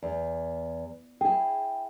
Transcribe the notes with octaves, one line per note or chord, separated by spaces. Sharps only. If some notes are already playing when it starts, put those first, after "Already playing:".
E2
E4 G#4 G5